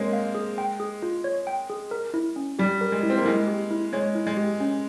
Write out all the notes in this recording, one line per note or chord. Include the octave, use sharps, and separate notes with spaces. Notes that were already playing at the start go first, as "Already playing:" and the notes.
Already playing: G#3 A#3 C4 C#5
F5
G#4
G5
G#4
F4
C#5
G5
G#4
A#4
E4
C#4
G3 G4
A#4
G#3
E4
C4
A#3
G#3 E4
G4
E4
G#3 C#5
E4
G#3
G4
C#4